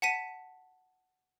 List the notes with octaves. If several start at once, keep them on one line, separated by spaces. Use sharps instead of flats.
F#5 A5 B6 D#7